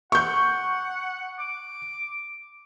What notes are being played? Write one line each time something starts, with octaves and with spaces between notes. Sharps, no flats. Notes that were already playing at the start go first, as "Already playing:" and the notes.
F#5 C#6 G6
D6